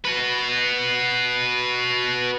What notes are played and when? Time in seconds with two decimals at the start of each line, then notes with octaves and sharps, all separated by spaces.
0.05 F#4 B4